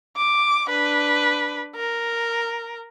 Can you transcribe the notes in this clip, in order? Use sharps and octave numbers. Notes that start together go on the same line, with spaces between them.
D6
D4 B4
A#4